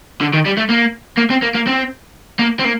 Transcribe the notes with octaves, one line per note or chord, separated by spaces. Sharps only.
D3
D#3
G3
A3
A#3
A#3
C4
A#3
A#3
C4
A#3
C4
A#3